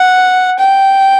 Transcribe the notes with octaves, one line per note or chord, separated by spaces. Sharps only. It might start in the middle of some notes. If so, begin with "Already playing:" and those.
Already playing: F#5
G5